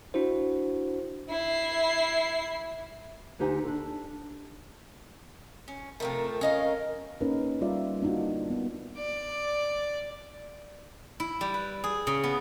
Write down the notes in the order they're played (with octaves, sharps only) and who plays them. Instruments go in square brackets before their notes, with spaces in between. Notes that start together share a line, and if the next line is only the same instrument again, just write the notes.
[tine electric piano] D4 E4 F#4 C5
[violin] E4 C7
[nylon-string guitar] D2 D#4 G4 C5 F#5 G#5
D4 A4
[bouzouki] C#4
[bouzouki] C3 F3 A3 [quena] A#4
[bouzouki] C#4 D#5 F5 [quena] A#4
[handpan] A#3 C#4 D#4 A#4 B4
G3 F4 D5 E5
A#3 D4 D#4 F4 F#4
B3
[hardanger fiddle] D5
[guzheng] E4
G3
B4
G#4
C#3
B3